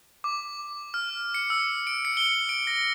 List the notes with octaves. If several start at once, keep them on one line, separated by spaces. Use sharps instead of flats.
D6
F6
C#7
E6
D7
C#7
G7
D7
A#6